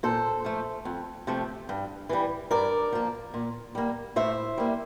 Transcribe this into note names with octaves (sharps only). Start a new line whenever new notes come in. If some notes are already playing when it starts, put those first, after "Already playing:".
A#2 A4 C5
F3 A3
F2
C3 F3 A3
G2
E3 G3
G2 A#4 D5
F3 A#3
A#2
G3 A#3
A2 C5 E5
G3 A#3